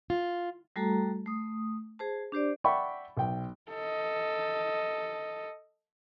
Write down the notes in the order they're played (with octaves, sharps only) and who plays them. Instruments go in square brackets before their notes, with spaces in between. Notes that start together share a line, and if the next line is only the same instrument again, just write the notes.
[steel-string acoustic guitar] F4
[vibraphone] G3 A3 F#4 A4 A5 A#5
A3 D#6
G#4 C5 A5
D4 G4 C5 D5
[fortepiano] D5 E5 F#5 G5 B5 C#6
B1 G5
[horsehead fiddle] A4 D#5